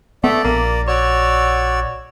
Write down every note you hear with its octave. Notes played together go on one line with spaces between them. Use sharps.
A3 B3 D5
A#1 A#3
F#4 C#5 D5 E6